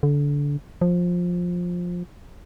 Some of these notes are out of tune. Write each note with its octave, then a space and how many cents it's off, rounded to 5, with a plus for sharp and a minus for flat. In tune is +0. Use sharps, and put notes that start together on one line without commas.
D3 -25
F3 +15